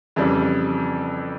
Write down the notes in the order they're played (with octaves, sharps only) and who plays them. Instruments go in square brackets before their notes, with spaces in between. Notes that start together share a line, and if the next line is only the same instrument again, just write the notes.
[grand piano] F2 C#3 E3 G3